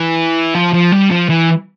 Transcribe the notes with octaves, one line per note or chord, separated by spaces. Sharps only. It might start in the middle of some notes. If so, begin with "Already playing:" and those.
Already playing: E3
F3
F3
G3
F3
E3